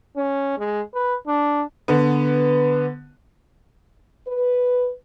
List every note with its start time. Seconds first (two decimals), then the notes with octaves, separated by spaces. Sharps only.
0.16 C#4
0.58 G#3
0.94 B4
1.27 D4
1.88 D3 B3
4.27 B4